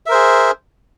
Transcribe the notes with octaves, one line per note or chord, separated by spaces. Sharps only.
G#4 A#4 C5 E5